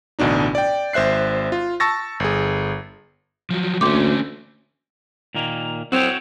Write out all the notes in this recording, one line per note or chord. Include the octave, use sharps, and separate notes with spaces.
A1 D2 B2 D4 D#4
D5 G5
G#1 C5 E5 F#6 C7
F4
A5 C#6 E6 A6 A#6
G1 G#4
F3 F#3
D2 A3 A#3 C#4 C6 D6
A#2 D#3 A#3
C4 F#4 C#5 G5